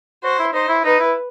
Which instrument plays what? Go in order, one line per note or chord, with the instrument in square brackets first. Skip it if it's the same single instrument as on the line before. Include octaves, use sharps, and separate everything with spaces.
[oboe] F#4 [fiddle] C5
[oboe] E4
[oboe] D#4 [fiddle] C5
[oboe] E4
[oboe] D#4 [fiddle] B4
[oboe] E4